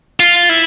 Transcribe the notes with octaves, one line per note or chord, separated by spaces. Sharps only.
F4
E4